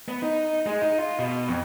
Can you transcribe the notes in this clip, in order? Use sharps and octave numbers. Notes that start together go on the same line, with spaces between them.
B3
D#4
G#3
D#4
F4
B2
F2